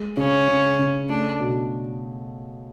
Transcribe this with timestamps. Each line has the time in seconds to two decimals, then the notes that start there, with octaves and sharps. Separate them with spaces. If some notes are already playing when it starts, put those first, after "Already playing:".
Already playing: G#3
0.17 C#3 C#4
0.48 C#3
0.79 C#3
1.09 A3 D4
1.40 B2